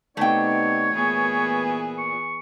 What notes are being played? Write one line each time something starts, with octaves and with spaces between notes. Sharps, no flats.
C3 A3 B3 D#4 C#5 D5 G5
A#2 E3 B3 G#4
C#6